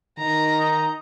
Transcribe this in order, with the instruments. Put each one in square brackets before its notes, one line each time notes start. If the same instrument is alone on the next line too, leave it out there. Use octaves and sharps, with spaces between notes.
[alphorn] D#3 [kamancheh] A#5
[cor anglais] D#4